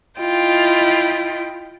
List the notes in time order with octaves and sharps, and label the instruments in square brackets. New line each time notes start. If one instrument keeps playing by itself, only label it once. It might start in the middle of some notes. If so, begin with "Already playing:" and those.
[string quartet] E4 F4 D#5 G5